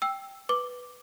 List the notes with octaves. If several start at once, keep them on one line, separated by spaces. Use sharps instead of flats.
G5 E6
B4 D6